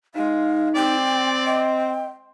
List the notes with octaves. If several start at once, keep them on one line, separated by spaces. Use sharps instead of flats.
G#3 D#4 F5
C4 D5 G5
D#5 G5